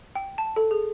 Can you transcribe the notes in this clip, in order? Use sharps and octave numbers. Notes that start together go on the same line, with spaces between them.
G5
A5
A4
G#4